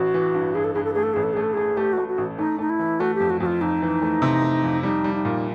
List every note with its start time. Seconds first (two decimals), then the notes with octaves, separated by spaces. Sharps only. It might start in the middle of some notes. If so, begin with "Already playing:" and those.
Already playing: A1 F#4
0.14 E3
0.34 G2
0.55 G2 G#4
0.64 A4
0.74 G2 G#4
0.84 A4
0.93 A3 G#4
1.03 A4
1.14 A1 G#4
1.23 A4
1.33 A3 G#4
1.43 A4
1.53 A3 G#4
1.77 A3 G4
1.93 A3 F#4
2.08 F#4
2.18 A1
2.38 A3 D#4
2.59 A3 D#4
2.70 E4
2.79 E3
3.00 A3 F#4
3.15 G4
3.20 F2
3.30 F#4
3.40 F2 F#4
3.46 F4
3.61 F2 D#4
3.82 E3
4.02 A3
4.22 C3
4.42 A3
4.64 F2
4.83 G3 D#4
5.04 G3
5.14 D#4
5.25 A#2